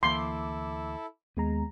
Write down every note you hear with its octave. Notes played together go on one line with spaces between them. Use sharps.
D2 E3 A#3 E4 A4 C6 D6
D#2 G#3 B3 A#5